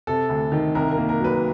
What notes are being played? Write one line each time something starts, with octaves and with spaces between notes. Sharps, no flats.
C3 A4
D2
D#3
C2 A#4
A#4
A#3
A#4
F#3
B4